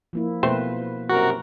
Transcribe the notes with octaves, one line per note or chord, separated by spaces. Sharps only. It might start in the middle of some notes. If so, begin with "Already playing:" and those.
F3 A#3 E4
B2 A3 A#3 C4 B4 C5
F#2 C3 F#4 A#4